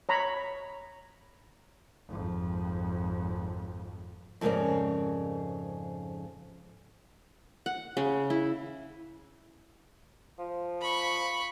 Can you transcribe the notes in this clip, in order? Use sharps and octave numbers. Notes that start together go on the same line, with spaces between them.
C#5 A#5 B5
G#1 F2
F2 G#2 C#3 C#4 A#4 D5
F#5
C#3
E4
F3
B5 C#6